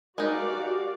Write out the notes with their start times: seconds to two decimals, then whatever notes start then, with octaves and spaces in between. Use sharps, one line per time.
0.18 G#3 D#4 F#4 A#4 B4 D5 F5
0.50 G4